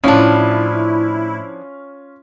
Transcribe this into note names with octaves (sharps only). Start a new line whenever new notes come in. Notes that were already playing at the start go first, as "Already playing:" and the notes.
A2 F3 A3 C#4 D4 E4 F4